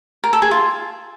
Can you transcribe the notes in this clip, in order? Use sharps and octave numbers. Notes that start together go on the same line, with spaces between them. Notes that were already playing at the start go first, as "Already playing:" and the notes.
A#4
A4
G#4
F4